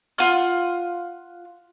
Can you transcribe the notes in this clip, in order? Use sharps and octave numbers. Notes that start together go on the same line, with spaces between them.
F4 F#5 F6